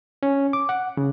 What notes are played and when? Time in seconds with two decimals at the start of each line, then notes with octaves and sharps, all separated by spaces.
0.23 C#4
0.53 D6
0.69 F#5
0.97 C#3